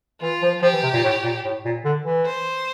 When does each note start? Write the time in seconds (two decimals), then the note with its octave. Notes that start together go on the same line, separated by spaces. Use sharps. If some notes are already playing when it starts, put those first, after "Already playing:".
0.21 E3 F4
0.42 F3
0.62 F3 G4
0.73 E3
0.83 C3
0.93 A#2
1.03 A2
1.24 A#2
1.45 A2
1.65 A#2
1.85 D3
2.06 E3
2.25 C5